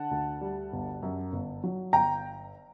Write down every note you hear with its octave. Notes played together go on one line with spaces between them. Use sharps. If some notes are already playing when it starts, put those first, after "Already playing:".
Already playing: D3 F#5 A5
D2
G3
G1
F#2
G1
F#3
G1 G5 A#5